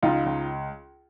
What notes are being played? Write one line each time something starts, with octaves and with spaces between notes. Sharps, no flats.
C#2 D#4 F4
C#2